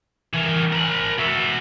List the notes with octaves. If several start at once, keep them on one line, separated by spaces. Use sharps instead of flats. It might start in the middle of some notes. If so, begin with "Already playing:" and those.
E3 A#4
A#4 B5
F#4 E5